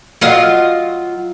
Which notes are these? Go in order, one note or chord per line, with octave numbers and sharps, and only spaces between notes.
F#3 F4 D#5